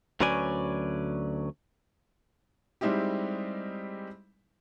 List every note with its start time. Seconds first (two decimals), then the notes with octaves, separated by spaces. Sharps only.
0.20 D2 F#3 C#4 B4 D5 G#5
2.81 G3 G#3 C4 D#4 E4 G4